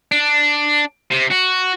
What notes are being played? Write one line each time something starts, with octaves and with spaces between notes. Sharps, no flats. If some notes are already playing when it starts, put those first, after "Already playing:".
D4
C3
F#4